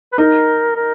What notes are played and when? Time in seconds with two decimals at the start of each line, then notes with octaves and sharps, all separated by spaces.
0.13 B4
0.18 D#4 A#4
0.76 A#4